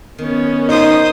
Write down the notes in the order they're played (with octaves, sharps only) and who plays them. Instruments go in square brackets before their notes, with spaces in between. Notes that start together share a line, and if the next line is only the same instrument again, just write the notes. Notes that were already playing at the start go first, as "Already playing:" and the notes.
[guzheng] D#3 [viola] B3 C#4
[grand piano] D#4 [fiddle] C5 D#6